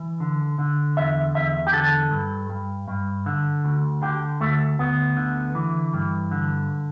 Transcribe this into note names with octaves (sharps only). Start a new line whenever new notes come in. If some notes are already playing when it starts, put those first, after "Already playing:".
Already playing: E3
D3
D3
E2 E5
E2 E5
G4
D3 A4
G2
G2
G2
D3
D2
D3 G4
D2 A3
D2 B3
D3
E3
G2
D3